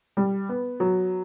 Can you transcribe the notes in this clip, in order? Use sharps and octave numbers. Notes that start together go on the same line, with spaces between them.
G3
B3
F#3